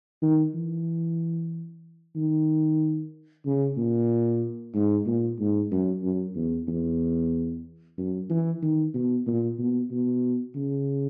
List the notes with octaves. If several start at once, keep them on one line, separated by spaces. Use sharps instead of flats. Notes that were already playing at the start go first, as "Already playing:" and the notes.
D#3
E3
D#3
C#3
A#2
G#2
A#2
G#2
F#2
F#2
E2
E2
F#2
E3
D#3
B2
A#2
B2
B2
C#3